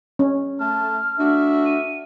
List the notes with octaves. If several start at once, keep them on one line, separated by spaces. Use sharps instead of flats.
C#4
A3 A5 F6
A3 D4 F#4 E5
D#7